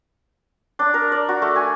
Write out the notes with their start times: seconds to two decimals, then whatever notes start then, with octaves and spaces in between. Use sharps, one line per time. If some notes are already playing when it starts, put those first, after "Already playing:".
0.79 D4
0.94 A#4
1.12 D5
1.29 F#4
1.42 A3
1.56 G#5